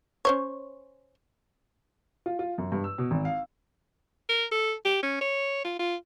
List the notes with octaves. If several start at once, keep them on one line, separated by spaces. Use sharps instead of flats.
C#4 C5 C#5
F4
F4
F#2
G2
E6
B2
G#1
F5
A#4
A4
G4
C#4
C#5
F4
F4